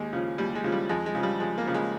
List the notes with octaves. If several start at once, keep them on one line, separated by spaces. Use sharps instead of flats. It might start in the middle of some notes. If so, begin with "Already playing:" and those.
Already playing: D#2 G#3
C#3 F3
D#2 G3
G#3
C#3 F3
G3
F2 G#3
G#3
C#3 F3
G3
F2 G#3
A#3
C#3 F3
G#3